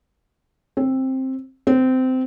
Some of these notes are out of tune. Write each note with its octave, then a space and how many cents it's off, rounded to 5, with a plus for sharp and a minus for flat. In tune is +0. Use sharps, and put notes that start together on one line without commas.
C4 +10
C4 -20